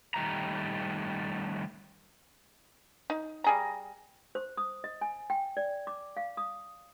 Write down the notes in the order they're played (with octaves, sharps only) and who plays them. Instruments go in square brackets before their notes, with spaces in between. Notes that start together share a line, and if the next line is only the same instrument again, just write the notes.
[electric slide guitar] D#3 G3 A3 A#5
[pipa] D#4
G3 G#4 A#5
[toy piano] C5
D#6
D#5
G#5
G5
D5
D6
F5
D#6